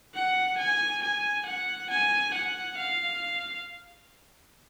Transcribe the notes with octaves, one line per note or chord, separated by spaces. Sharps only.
F#5
G#5
G#5
F#5
G#5
F#5
F5